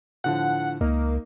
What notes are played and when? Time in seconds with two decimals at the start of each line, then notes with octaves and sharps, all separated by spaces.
0.24 A2 D3 F3 F#5
0.81 C#2 A#3 D#4